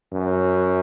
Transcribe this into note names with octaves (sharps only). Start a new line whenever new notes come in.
F#2